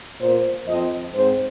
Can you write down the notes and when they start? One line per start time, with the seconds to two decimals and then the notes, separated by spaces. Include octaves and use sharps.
0.21 A#2 A#3 C5
0.67 F2 F3 C4 D#5
1.14 G#2 G#3 C4 C5